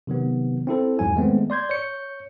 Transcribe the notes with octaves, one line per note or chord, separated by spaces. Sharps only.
C3 D#3 F#3 B3
C4 E4 A4
E2 G#2 F#3 G#5
D#3 G#3 A3 B3 C4
D5 C6 G6 G#6
C#5 G6 C#7